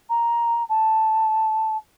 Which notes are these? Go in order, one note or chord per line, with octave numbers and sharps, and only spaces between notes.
A#5
A5